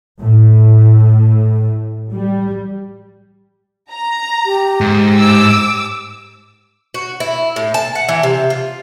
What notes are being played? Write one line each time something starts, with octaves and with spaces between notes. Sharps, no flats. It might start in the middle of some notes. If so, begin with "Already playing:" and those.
A2
G3
A#5
G4
G#2
D6 E6
F#4
E4
A2
A5
F#5
E3
C3
F4